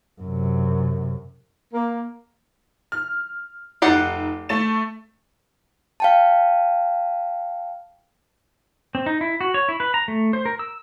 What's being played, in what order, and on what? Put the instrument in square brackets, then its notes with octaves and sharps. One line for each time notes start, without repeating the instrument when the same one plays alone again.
[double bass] F#2 C3
[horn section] A#3
[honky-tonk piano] F6
[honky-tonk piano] F1 D#4 C7 [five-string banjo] G4 D5 F#5
[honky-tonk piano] A3 A6 E7
[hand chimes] F5 G5 A5
[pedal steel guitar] C4
D#4
E4
F#4
C#5
E4
B4
A#5
A3
C5
A#4
E6